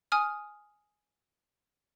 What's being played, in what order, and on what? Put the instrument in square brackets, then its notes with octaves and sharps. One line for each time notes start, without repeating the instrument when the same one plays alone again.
[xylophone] G#5 D#6 F6